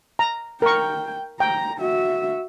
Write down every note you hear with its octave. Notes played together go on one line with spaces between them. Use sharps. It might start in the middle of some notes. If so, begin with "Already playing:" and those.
A#5
A#4 G5 C#6
G5 A#5
F#4 E5